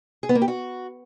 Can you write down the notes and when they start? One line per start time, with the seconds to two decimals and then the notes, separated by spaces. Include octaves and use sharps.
0.23 G#4
0.29 B3
0.35 A#3
0.42 G4
0.48 F#4